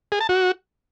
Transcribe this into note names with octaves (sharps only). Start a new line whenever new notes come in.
G#4
A5
F#4